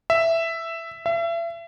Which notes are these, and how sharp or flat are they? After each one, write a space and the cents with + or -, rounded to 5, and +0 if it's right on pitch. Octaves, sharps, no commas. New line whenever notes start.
E5 +5
E5 +35